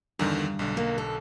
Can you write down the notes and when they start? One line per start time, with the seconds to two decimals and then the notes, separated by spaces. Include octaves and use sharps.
0.19 E2 G2 D3 D#3
0.59 B1 D3
0.77 A#3
0.98 A4